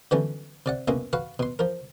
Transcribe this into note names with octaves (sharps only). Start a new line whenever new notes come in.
D3 E3 F#3 G3 B3 C#4
C3 D5 F#5
C2 B2 G#3 A#3 C#4
F#4 B4 F5 F#5
B2 C6
F3 A#4